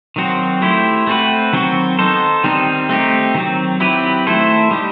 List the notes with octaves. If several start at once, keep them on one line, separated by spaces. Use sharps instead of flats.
D#3 F#3 C4 F#4
A3 E4 G4 C5
A3 C4 F#4 B4
D#3 F#3 C4 F#4
B3 D#4 A4 C5
D#3 G3 C4 D#4
A3 C4 D#4 G4
D#3 F#3 C4
F#3 C4 E4 G4 B4
D#3 A3 E4 A4 C5
G3 D#4 G4